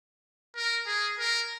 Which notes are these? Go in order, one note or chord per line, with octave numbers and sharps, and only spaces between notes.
A#4
G#4
A#4